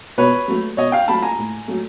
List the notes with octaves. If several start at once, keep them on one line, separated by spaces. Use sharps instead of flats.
B2 B4 C#5
F#3 A3
B2 C#5 D#5
F5 G5
F#3 A3 A5 B5
G#5 A#5
A2
F#3 A3